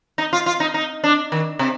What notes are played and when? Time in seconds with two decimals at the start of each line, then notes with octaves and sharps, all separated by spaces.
0.18 D#4
0.33 F4
0.46 F4
0.60 D#4
0.74 D#4
1.04 D4
1.32 D#3
1.59 C3